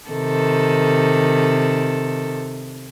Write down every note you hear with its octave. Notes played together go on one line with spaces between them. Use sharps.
C3 D#3 A4